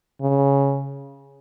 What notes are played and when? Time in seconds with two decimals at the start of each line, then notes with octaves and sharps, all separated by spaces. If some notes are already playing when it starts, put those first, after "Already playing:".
0.21 C#3